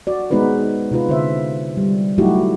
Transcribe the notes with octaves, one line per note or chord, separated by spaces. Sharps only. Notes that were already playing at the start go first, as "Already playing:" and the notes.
F#4 D5
G#3 B3 D#4 F#4 B4 C5
C3 D#4 F4 B4
D3 C5 E5
G3
F#3 A3 D#4 E4 F#4 G4